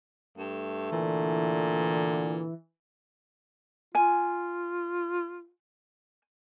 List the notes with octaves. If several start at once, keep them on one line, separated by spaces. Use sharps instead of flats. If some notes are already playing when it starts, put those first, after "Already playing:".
G2 A3
A#2 D3 E3
F4 G#5